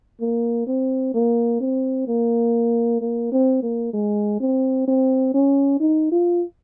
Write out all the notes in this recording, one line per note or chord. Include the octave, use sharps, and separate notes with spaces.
A#3
C4
A#3
C4
A#3
A#3
C4
A#3
G#3
C4
C4
C#4
D#4
F4